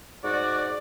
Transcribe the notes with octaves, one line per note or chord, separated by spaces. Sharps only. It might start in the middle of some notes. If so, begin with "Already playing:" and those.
G#2 F#4 D5